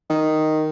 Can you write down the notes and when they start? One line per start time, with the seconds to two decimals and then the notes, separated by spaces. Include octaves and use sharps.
0.10 D#3